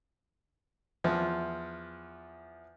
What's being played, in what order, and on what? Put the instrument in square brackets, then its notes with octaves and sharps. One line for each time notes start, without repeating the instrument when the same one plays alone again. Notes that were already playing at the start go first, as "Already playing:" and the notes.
[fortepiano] E2 F3